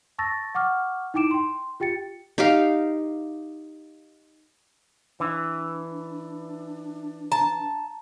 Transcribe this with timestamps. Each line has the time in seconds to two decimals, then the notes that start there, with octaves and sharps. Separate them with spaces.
0.19 A5 C#6 E6 A6 A#6
0.55 F#5 C#6 D6 F6
1.14 D#4 E4 G5 D6 D7 E7
1.31 G5 C6
1.80 F4 G4 G5 A6 C#7
2.38 D#4 G4 F5
5.20 E3 D4
7.32 A5 A#5